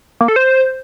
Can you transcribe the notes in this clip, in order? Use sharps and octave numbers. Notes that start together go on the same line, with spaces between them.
A#3
A4
C5